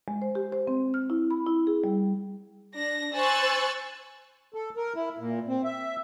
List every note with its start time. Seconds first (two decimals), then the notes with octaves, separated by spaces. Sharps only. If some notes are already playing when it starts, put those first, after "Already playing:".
0.08 G#3
0.22 C5
0.35 G4
0.52 C5
0.67 C4
0.94 F6
1.10 E4
1.31 B5
1.46 E4
1.67 G#4
1.84 G3
2.73 D4 A#6
3.15 C5 G#5 C#6 E6 F#6 A6
4.54 A4
4.77 A#4
4.96 E4
5.18 A#2
5.48 C4
5.64 E5